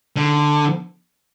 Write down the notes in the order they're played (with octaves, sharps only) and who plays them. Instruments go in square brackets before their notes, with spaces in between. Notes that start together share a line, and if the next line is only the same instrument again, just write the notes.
[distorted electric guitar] D3